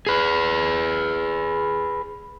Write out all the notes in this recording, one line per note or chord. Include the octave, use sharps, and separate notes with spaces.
G#4 B4